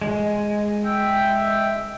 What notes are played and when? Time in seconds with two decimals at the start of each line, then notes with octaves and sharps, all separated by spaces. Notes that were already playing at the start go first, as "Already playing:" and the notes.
0.02 G#3
0.84 E5 G5